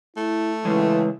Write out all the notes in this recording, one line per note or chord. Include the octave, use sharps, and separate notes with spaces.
A3 E4
C#3 E3 G#3